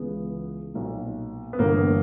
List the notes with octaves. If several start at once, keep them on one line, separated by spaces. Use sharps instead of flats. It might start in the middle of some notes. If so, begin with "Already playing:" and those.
Already playing: C#2 C#3 E3 B3
B1 A#2
B3
G1 G2 E3 A#3